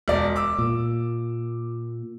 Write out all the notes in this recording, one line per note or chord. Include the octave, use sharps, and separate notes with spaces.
E1 D5
D6 E6
A#2